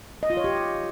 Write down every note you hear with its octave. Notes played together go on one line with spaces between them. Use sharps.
D#5
F4
C#5
G4